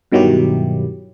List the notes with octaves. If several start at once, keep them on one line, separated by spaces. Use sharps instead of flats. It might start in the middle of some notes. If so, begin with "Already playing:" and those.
G2 B2 D#3 F#3 E4 G4